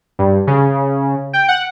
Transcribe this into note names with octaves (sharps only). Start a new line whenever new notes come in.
G2
C#3
G5
F#5